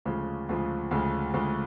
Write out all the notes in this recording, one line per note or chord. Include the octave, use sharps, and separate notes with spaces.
D2 C#3 F3 G#3
D2 C#3 F3 G#3
D2 C#3 F3 G#3
D2 C#3 F3 G#3